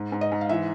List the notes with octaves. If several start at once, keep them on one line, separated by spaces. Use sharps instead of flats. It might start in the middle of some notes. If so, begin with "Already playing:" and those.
Already playing: G#2
G#2
D#5
G#2
F5
E3 E5